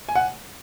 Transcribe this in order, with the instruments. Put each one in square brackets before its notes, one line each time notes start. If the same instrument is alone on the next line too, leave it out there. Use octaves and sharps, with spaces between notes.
[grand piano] G#5
F#5